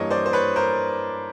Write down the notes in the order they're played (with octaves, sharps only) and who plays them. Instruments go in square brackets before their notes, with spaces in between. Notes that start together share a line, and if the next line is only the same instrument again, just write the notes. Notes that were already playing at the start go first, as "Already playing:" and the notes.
Already playing: [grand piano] G2 E3 G3 A#3 C#5 D#5
C5 D5
C5
B4 C#5
A#4 C5